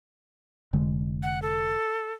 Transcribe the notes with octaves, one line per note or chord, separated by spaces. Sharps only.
F1 D3 G#3
F#5
A4